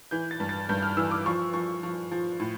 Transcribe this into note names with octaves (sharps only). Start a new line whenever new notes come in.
E3 G6
A6
G2
A6
G2 G6
F6
E3 E6
D6
F3 C#6
F3 C#6
F3
F3
A2